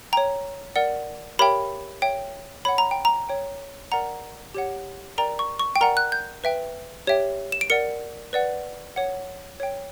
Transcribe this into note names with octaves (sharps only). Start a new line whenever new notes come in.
C#5 G5 A#5
A#4 D5 F#5
G4 A#4 C#5 E5 G5 B5
C#5 E5 G5
C#5 F#5 B5
A#5
G5
A#5
C#5 G5
A#4 D5 F#5 A#5
G4 C#5 F#5
A#4 D5 G5 A#5
C#6
C#6
G5
A#4 D5 F#5 A#5
F#6
G6
B4 E5 G5
G4 C#5 E5 G5
E7
D7
A#4 D5 F#5 C#7
B4 D5 F#5
C#5 F#5
C#5 G5